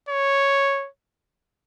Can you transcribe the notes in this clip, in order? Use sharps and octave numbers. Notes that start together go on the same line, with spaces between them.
C#5